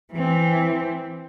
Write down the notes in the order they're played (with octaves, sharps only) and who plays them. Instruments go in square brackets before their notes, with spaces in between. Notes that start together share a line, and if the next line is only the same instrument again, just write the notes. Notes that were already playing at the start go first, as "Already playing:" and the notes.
[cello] E3 C4